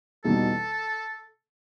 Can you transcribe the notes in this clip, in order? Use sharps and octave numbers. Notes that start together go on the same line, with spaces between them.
E2 B2 G3 D#4 A4